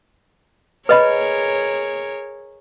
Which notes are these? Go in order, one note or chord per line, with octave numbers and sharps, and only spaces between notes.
G#4 A#4 B4 C#5 D#5 B5